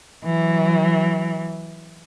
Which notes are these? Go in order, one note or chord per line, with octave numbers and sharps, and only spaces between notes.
E3 F#3